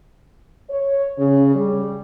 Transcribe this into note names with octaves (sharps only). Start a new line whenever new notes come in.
C#5
C#3
G3